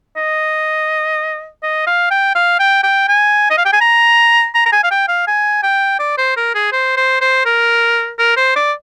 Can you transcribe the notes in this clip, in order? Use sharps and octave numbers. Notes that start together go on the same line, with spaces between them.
D#5
D#5
F5
G5
F5
G5
G5
G#5
D#5
F5
G5
G#5
A#5
A#5
A#5
G#5
F5
G5
F5
G#5
G5
D5
C5
A#4
G#4
C5
C5
C5
A#4
A#4
C5
D5